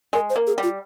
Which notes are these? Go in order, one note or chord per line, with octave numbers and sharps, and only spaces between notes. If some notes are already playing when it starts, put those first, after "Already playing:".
G#3 A#4
C5
A#3
G#4
G3
F4